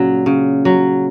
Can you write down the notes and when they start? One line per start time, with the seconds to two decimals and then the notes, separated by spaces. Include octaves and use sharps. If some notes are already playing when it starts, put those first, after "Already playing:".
Already playing: A#2 C#3 F#3
0.26 C#3
0.65 F#3